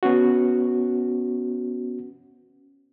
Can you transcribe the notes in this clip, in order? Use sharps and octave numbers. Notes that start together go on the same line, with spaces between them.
B3 C#4 F#4